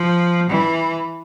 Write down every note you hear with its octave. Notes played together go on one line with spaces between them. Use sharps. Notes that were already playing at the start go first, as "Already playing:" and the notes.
Already playing: F3
E3